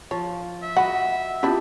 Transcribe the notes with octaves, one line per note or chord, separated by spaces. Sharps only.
F3 C#5
E5
F#4 D#5 F#5 B5
B3 C#4 D4 E4 F4 G4